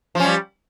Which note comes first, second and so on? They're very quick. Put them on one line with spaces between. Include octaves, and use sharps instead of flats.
F3 C#4 G3